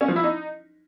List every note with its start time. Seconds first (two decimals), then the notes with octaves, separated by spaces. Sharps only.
0.01 C#4
0.08 F3
0.16 E4
0.24 D#4